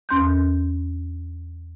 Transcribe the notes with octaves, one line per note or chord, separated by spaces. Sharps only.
E2 C#4 C6 F#6 G6